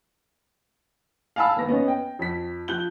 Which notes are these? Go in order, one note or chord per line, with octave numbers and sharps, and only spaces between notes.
F5 G#5 A5 B5 E6
G#1 B3 A#6
B3 C#4 D#4
G5
F2 B6
F3 F#6 G6 G7